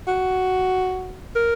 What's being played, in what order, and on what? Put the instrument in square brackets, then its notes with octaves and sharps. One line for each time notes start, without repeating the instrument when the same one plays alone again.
[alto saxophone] F#4
A#4